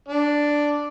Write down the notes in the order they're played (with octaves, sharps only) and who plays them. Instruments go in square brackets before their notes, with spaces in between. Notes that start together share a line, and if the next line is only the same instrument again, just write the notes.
[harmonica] D4